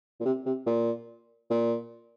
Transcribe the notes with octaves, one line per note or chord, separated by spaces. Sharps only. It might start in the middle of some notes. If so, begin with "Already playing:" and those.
A#2
C3
C3
A#2
A#2